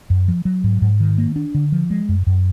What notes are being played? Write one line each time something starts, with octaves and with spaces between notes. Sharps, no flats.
F#2
F3
F#3
G#2
G#2
D#3
A#3
D4
D3
F3
G#3
F#2
F#2